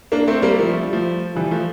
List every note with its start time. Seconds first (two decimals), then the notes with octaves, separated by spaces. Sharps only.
0.12 A#3 D4
0.28 A3 C4
0.42 G3 A#3
0.58 F3 A3
0.73 A3
0.83 G3
0.93 F3 A3
1.36 E3 G3
1.51 F3 A3